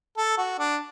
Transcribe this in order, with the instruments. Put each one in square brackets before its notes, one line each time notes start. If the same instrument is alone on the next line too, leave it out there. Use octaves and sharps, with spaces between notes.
[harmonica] A4
F#4
D4